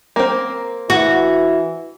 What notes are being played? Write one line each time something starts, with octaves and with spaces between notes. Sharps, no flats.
A#3 C4
E3 F#4